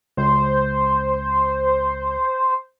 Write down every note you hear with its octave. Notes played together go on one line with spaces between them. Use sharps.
C#2 C5